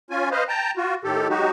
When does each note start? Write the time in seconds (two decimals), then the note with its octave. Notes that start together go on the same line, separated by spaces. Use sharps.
0.10 C#4 F4 G#5
0.31 B4 C5 D#5 F5
0.48 G5 A5 A#5
0.77 F4 F#4
1.04 A2 D#3 G4 A4
1.30 F#3 G#3 D#4 F#4 G4